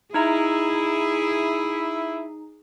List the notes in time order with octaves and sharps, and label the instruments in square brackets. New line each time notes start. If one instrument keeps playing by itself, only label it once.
[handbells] D#4 A#5 [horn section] E4 [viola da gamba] G#4